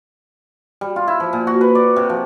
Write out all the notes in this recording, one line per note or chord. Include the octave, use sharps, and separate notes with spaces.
G3
F4
E4
F3
A#2
F#4
B4
D5
C3
F3